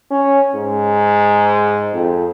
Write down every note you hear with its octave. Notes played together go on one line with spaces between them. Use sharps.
C#4
G#2
F2